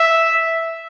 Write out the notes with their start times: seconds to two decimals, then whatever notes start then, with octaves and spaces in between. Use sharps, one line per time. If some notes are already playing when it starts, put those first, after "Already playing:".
Already playing: E5